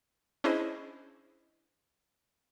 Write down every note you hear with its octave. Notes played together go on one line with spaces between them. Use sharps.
C#4 D4 E4 G#4 C5 D#5